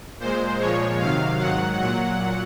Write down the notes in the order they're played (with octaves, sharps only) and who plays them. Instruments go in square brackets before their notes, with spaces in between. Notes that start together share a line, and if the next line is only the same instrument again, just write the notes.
[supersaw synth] A#2 G#3 C5
A#2 F3 G#3 C#5
C3 D#3 F#3 F5
G#2 D#3 F#3 F#5
A#2 F#3 F#5